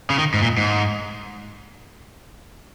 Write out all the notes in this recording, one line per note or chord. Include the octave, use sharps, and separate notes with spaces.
C#3
D#3
G#2
A#2
G#2